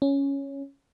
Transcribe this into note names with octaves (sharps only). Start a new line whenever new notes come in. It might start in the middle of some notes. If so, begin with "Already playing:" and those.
C#4